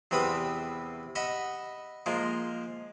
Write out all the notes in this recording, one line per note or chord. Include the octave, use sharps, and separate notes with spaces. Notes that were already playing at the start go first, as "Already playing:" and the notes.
E2 C3 C4 B4 B5 D#6
D#5 E5 F#5 B5
F3 G#3 A#3